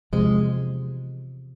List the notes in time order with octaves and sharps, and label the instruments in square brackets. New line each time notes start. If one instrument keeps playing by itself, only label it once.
[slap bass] E2 C3 F3 [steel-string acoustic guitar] G#3